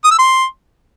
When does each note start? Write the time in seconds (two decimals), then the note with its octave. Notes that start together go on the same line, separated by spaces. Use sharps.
0.04 D#6
0.11 E6
0.18 C6